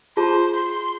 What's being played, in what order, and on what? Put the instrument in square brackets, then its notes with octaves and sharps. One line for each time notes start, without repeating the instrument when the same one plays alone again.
[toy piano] F4 G#4 A5 [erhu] C5
[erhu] C6